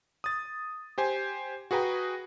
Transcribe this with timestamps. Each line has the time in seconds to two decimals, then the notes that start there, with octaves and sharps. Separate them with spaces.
0.24 D#6 A6
0.98 G4 C5 G#5
1.71 F#4 G#4 B4 G5 A#5